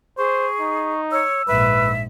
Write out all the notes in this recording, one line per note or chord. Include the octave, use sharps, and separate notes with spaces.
G#4 C5 C#6
D#4
C#5 E6
A#1 G#2 B4 E5